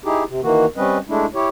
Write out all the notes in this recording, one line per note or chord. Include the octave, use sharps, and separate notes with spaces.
D#4 E4 G4 G#4
C3
D#3 E3 A#3 F#4
G3 C4 C#4 B4 D#5
G#3 A3 D4 E4
E4 G4 C#5